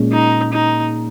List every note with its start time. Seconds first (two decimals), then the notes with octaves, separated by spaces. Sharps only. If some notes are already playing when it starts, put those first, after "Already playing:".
Already playing: A#2 G#3 C#4
0.12 D#4
0.53 D#4